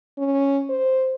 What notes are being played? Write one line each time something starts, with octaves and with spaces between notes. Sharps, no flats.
C#4
C5